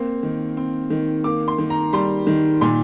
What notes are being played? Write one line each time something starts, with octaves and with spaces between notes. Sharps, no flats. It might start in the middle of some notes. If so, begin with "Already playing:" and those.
Already playing: A#3 C4
D#3
C4
D#3
A#3 D6
C6
D#3
A#5
G3 C6
D#3
A#2 C6